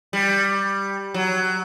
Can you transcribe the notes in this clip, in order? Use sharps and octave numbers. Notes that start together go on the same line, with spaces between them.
G3
F#3